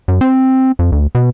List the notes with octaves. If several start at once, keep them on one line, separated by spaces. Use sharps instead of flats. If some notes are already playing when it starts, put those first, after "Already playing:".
F#2
C4
F2
D2
B2